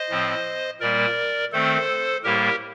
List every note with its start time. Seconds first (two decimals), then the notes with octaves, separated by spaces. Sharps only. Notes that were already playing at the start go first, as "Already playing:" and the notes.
Already playing: C5 D#5
0.10 A2 F3 C4
0.80 A#2 G3 A#3 A#4 D5
1.52 D#3 A3 C4 A4 C5
2.24 A2 G3 A#3 G4 A#4